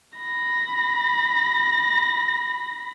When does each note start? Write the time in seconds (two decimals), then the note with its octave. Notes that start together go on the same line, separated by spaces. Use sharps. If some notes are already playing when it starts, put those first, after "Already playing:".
0.18 B5 A#6